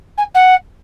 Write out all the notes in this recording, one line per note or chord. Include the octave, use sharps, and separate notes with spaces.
G#5
F#5